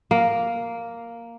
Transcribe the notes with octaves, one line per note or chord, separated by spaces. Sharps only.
A#3